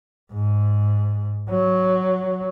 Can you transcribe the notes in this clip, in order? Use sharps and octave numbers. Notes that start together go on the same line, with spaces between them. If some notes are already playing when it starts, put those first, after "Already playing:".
G#2
F#3